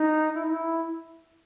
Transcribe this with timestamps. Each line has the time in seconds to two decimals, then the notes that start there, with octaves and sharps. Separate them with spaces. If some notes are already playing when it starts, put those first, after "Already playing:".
Already playing: D#4
0.35 E4
0.44 D#4
0.52 E4